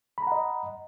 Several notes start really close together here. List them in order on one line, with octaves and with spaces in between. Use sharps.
B5 A#5 F#5 D#5